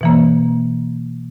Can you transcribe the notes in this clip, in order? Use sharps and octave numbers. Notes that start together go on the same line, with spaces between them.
B2 E3 A#3